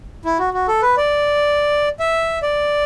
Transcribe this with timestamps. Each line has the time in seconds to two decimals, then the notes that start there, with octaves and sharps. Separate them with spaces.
0.25 E4
0.39 F#4
0.54 F#4
0.68 A4
0.82 B4
0.97 D5
1.99 E5
2.42 D5